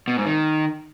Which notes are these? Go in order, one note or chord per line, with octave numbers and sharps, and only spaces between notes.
B2
G#2
D#3